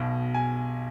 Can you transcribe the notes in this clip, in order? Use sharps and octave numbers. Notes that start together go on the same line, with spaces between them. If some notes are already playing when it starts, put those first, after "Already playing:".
Already playing: B1 B2
G#5